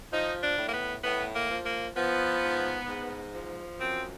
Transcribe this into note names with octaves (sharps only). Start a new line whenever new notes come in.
F3 D#4
D4
A2
A#3
B3
A2 B3
A#3
F3
A#3
F3 B3
G#2
G#2
F3
F#2 C4